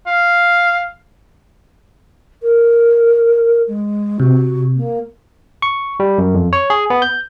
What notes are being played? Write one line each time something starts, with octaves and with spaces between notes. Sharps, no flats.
F5
A#4
G#3
C3 F#4
A#3
C#6
G3
F#2
F2
C#5
G#4
B3
G6